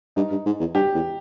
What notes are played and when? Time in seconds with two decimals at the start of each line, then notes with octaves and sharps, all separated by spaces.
0.16 G2 D#4
0.31 G2
0.46 G#2
0.60 E2
0.75 G2 G4
0.94 E2